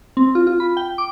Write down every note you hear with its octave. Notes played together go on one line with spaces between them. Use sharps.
C4
F4
F4
B5
G5
D6